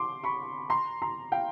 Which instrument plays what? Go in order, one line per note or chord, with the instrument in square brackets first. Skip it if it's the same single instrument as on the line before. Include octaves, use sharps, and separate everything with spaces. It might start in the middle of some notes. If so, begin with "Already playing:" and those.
Already playing: [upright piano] C6 D6
B5 C#6
A#5 C6
A#5 C6
F5 G5